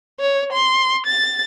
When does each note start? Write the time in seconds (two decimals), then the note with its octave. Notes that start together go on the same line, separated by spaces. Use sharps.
0.20 C#5
0.53 C6
1.06 A6